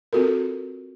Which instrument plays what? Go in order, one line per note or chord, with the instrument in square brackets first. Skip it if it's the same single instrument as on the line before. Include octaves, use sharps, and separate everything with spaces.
[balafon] C4 F4 F#4 A4 A#4